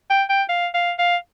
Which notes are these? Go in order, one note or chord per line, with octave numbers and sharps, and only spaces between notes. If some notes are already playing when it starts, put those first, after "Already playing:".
G5
G5
F5
F5
F5